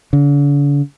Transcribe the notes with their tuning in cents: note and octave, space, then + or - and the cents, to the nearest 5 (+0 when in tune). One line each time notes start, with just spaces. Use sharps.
D3 -45